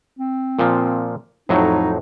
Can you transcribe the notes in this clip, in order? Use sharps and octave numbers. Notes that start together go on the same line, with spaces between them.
C4
A#2 F3
F2 A2 F#3 D#4